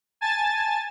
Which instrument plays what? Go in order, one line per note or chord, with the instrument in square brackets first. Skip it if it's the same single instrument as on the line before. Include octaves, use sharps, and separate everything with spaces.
[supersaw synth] G#5 A5 A6